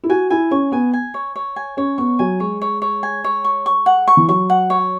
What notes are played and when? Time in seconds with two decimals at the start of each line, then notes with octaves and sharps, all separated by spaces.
0.03 E4
0.09 F#4 G#5
0.30 E4 G#5
0.51 C#4 C#6
0.72 B3 G#5
0.93 G#5
1.14 C#5
1.36 C#5
1.56 G#5
1.77 C#4 C#5
1.98 B3 C#6
2.19 F#3 G#5
2.40 G#3 C#5
2.62 C#5
2.82 C#5
3.03 G#5
3.24 C#5
3.44 C#6
3.66 C#6
3.86 F#5
4.08 C#6
4.17 E3
4.28 F#3 C#6
4.50 F#5
4.70 C#5